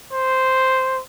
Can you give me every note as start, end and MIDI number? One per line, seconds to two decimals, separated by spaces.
0.13 1.00 72